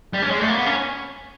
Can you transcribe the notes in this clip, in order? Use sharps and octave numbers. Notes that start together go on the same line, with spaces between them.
G3
C#4
G#3
A3
A#3
B3
C#4